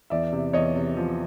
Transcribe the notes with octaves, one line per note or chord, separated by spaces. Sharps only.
E2 D5 E5
C3
E2 C#5 D#5
C3
F3